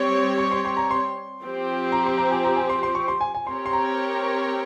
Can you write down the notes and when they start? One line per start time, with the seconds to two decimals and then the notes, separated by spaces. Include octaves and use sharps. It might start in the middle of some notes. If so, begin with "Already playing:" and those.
Already playing: G3 C4 G4 C#5
0.38 C#6
0.51 C6
0.65 C6
0.77 A#5
0.91 C6
1.42 F3 C4 G4
1.92 A#5
2.06 C6
2.18 A#5
2.31 G#5
2.44 A#5
2.57 G#5
2.70 C6
2.83 C6
2.95 C#6
3.08 C6
3.21 G#5
3.35 G#5
3.46 C4 G4 A#4 C#5 C6
3.66 C6
3.73 A#5